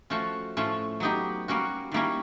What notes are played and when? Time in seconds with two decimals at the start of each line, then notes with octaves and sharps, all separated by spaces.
0.10 F3 A3 C#4 F#4
0.57 A2 F3 A3 C#4
1.00 F#3 B3 D#4 G4
1.48 G3 A#3 C#4 F#4
1.92 D#3 G3 A#3 C#4 E4